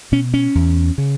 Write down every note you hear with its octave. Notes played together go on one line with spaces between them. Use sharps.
B2 C#4
C#4
E2
C#3